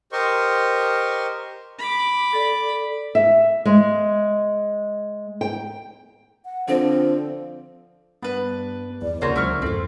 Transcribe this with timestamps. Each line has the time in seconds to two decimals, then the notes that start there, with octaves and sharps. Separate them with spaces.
0.12 G4 A#4 C5 D#5 C6 C#6
1.79 B5 D6
2.33 A4 D5
3.15 E5
3.65 G#3
5.41 G5
6.45 F#5
6.68 D3 F3 C4 C5
8.23 G2 B3 D4 B4
9.02 E2 D5
9.22 D2 C#3 A#3 F4 F#4 A#4 C5 C#5
9.36 C#2 F#3 E4 C#6 F6
9.62 G#1 F2 C4 F4 A4